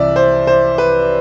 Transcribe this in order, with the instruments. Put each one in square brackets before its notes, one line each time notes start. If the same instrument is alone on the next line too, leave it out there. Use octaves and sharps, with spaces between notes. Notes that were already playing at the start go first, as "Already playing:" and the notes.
Already playing: [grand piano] C2 C3 E3 D5 E5
C5
C5
B4